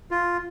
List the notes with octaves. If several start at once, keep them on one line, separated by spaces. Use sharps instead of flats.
F4